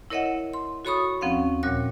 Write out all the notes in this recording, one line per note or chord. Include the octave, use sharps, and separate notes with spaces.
E4 A#4 C#5 D#5 E5 F#5
C6
F#4 A4 C#5 B5 C#6 D#6
D#2 F3 C4 C#4 F5 F#5
D2 A#2 G3 A#4 C#5 F#6